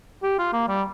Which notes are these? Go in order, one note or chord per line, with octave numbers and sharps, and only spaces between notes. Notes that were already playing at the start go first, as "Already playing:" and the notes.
G4
F4
A#3
G3